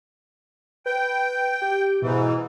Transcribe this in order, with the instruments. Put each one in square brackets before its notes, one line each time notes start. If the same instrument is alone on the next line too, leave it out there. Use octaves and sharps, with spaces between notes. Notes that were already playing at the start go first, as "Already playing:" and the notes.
[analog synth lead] B4 [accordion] G5
[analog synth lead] G4
[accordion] G#2 E3 [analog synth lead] B2